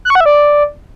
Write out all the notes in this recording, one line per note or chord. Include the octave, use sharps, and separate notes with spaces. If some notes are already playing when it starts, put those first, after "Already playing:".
F#6
C#6
F#5
E5
D5